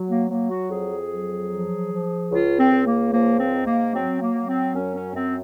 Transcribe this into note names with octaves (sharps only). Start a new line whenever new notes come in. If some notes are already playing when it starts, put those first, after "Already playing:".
Already playing: F#3
A#3
F#3 A#3
F#4
F2 G#4
F#3
F3
F3
C#2 F4
C4
C#2
A#3
F3 A#3
C4
G#2
A#3
F#3 C4
A#3
F#3
C4
F#2 C#4
C#4
F#2 C4